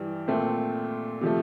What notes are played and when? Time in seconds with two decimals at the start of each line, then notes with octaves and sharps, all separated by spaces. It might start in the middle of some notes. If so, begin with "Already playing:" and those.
Already playing: G2 E3 G3
0.28 A#2 A3 C4
1.21 C3 F3 A3